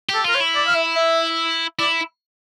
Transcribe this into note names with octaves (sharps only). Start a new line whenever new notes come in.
G4
A4
F4 A#4
C#5
E4
D5
F5
E5
E5
E4 D5